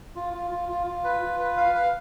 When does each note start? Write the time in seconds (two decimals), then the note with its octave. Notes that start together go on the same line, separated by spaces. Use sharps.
0.16 F4
0.33 F4
0.51 F4
0.69 F4
0.87 F4
1.04 B4
1.22 F4
1.40 B4
1.57 F5
1.75 F5